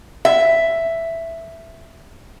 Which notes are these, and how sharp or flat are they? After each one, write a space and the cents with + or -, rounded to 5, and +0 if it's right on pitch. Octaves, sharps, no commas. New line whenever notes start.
E5 +5